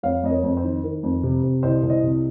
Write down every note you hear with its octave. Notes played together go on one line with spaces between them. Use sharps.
F2 C#5 F5
F2 D#5
A#4 C#5
F2
C5
D#3
D#3 A#4
F2
C3
C3
C2 C5 D#5
C2
C5 D#5
C3